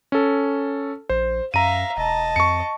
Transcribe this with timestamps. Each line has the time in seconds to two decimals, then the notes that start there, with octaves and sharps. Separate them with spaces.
0.12 C#4 A4
1.09 A#1 C5
1.54 F#2 E5 F5 A#5 D#7
1.97 E1 D#5 A5
2.36 F2 C#6 C#7